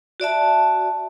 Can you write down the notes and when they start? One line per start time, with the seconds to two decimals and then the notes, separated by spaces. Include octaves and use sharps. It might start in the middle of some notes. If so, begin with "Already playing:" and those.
0.20 F#4 D5 E5 A5